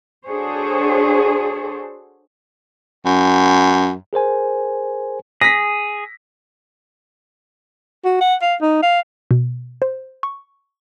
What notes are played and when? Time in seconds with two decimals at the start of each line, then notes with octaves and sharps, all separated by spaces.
0.26 D4 F#4 G#4 A4 C5 C#5
3.05 F#2
4.13 G#4 A#4 C5 G#5
5.41 G#4 A#6 B6
8.05 F#4
8.21 F#5
8.42 F5
8.61 D#4
8.83 F5
9.31 B2
9.82 C5
10.23 C#6